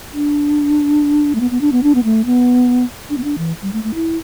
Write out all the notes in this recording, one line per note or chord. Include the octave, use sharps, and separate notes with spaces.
D4
A3
B3
B3
D4
B3
D4
B3
A3
B3
D4
B3
D4
E3
G3
A3
A3
E4